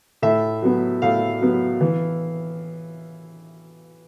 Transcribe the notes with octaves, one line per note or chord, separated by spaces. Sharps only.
A2 E5
F#3 B3
A2 F5
F#3 B3
E3